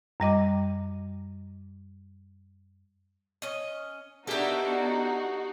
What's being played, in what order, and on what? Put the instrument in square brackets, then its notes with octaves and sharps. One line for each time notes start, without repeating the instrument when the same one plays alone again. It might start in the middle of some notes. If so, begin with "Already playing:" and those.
[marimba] F#2 G3 D#5 D6
[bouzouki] C#4 D#5
[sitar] A#3 G4 [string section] B3 D4 [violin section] D#4 F#4 [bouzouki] A4 E5